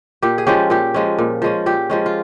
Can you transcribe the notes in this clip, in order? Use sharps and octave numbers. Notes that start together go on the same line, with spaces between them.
A#2 G4
G#4
F3 G#3 C#4 G4
A#2 G4
F3 G#3 C#4
A#2
F3 G#3 C#4
A#2 G4
F3 G#3 C#4
F4